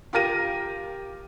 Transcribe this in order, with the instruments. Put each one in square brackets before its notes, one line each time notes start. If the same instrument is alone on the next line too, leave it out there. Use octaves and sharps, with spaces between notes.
[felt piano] F4 G4 A#4 A#6 D#7